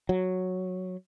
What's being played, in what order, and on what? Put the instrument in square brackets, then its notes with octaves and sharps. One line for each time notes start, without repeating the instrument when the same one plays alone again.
[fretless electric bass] F#3